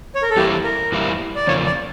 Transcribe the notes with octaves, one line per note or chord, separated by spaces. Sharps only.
C#5
A#4
A4
E2 E3 G3 A#3 E4 G4
A#4
E2 E3 G3 A#3 E4
D5
E2 C#3 F3 A#3 C#5
D5